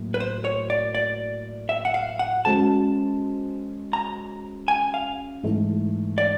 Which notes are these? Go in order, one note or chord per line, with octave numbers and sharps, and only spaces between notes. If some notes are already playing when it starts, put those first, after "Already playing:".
Already playing: A2 F#3 A#3
B4
C5
C#5
D5
D5
E5
F#5
F5
F#5
G#3 C#4 F#4 A4 C5 A5
A#5
G#5
F5
G#2 E3 A3
D5